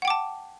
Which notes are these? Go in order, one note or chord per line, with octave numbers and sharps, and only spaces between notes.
F#5 G5 A5 D6